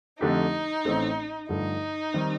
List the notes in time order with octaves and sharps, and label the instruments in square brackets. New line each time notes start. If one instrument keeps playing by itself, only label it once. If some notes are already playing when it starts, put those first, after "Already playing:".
[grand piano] F2 D3 A3 D4 G4 [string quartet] D#4
[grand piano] A1 A2 A3 C4
[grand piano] G2 D3 F3 A3 [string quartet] D#4
[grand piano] D#3 G3 C4